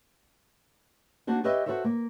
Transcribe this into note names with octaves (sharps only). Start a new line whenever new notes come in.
A#3 D4 F#4 C5
G4 B4 C#5 D#5 E5
F#4 A4 C5 C#5 E5
A#3